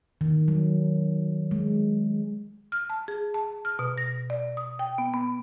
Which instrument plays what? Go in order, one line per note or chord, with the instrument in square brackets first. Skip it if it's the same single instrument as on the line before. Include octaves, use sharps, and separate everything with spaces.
[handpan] D#3
F#3
G#3
[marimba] F6
A5
G#4
A5
F6
B2
A#6
D5
D#6
G5
B3
B3